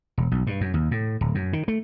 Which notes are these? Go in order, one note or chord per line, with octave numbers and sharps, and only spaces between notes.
E1
B1
G2
F#2
D#2
A2
D1
F#2
D#3
A3